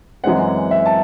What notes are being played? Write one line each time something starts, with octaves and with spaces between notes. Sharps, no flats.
F#2 E3 G#3 C4 F#5
E5
A5